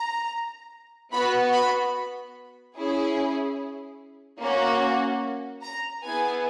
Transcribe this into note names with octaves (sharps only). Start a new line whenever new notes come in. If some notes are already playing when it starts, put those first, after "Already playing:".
Already playing: A#5
B3 F#4 B5
B5
C#4 E4 G#4
A#3 C#4 F#4
A#5
B3 E4 G#4 G#5